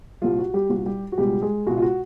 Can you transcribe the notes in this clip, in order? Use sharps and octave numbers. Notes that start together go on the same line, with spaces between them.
C2 A#2 G3 F4
F#4
G3 G4
C2 A#2 G3 F#4
G3 G4
F#4
C#2 B2 G3 G#3 G4
G#3 G#4
C#2 B2 G#3 F#4
F4
F#4